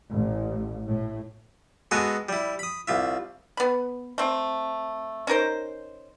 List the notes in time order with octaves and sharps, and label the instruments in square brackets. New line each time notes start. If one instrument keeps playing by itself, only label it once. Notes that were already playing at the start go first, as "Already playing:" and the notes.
[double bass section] A1
A2
[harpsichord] G#3 B3 F#4 A4 B4 G#5
G3 E4
B5 D#6
C2 F4 E5
[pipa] B3 B5
A3 C4
C#4 D#4 A#4 C5